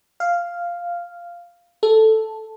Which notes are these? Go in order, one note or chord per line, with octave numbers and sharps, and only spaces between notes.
F5
A4